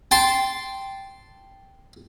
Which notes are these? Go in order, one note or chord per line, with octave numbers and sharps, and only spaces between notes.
G5 A5 C6